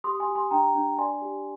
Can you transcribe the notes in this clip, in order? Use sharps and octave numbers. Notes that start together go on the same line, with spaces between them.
G4 C6 D#6
G#5 C6
G4
G#5 C6
D4 G5 A#5
D4
D5 G#5 C6
G4